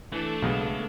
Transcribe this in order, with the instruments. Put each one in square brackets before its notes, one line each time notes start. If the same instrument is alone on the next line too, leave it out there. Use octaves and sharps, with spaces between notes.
[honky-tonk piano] E3 [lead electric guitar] A3 [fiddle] D4 A4
[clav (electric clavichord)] B1 [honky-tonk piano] C#3 G#3 B3